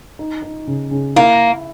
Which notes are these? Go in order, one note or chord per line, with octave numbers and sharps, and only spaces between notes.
D#4
D#4
C#3
C#3
A#3 E4